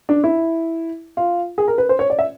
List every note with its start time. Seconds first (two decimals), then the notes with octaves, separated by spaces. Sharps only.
0.09 D4
0.24 E4
1.17 F4
1.58 G#4
1.68 A#4
1.78 B4
1.89 C5
1.99 C#5
2.10 D5
2.19 E5